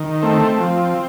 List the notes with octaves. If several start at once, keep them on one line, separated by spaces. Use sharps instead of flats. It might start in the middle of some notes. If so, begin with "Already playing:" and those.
Already playing: D#3
A3 C4
F3